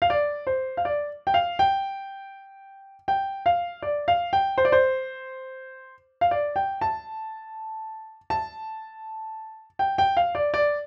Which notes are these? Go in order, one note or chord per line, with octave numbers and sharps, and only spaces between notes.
F5
D5
C5
F5
D5
G5
F5
G5
G5
F5
D5
F5
G5
C5
D5
C5
F5
D5
G5
A5
A5
G5
G5
F5
D5
D5